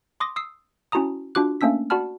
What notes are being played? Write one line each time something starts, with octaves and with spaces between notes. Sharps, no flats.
C6 D6 D#6 A#6
D#6 E6 C7
C#4 E4 F#4 A5 A#5 D#6
D4 F4 F#4 D6 F#6
A3 A#3 C#4 D4 E6 B6
F#4 D5 F#5 A5 B5 F6